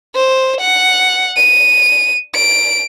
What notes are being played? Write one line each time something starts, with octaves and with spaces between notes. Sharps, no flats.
C5
F#5
D#7
D7